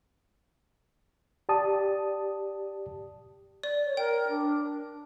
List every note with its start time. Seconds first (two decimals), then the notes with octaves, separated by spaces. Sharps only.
1.49 G4 D5 A5 D#6
3.63 D5
3.86 C#5
3.97 A#4 G5
4.29 D4